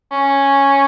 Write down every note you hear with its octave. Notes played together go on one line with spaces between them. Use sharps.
C#4